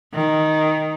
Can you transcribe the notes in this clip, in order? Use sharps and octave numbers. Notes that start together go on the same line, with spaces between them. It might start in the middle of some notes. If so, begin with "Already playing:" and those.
D#3